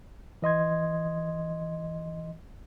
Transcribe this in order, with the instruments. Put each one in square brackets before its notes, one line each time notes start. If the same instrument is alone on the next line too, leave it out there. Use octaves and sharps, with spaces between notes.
[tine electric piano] E3 D#5 C6 G#6